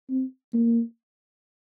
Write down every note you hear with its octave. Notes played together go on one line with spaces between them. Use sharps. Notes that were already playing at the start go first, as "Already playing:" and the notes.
C4
A#3